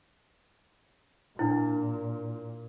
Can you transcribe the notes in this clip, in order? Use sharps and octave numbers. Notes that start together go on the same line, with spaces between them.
A#2 C#4 D4 E4